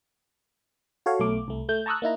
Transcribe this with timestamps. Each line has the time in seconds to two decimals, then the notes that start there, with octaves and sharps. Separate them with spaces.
1.06 F#4 A4 C#5 F5
1.20 B1 A3 D6
1.48 C2 A3
1.69 A3 G6
1.86 A5 A#5 C#6 D#6 E6 F#6
2.02 A#3 D#4 E4 A#5